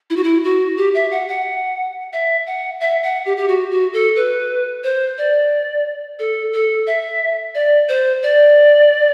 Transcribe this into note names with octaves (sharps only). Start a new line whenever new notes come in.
E4
F#4
E4
F#4
G4
E5
F#5
F#5
E5
F#5
E5
F#5
G4
G4
F#4
F#4
A4
B4
C5
D5
A4
A4
E5
D5
C5
D5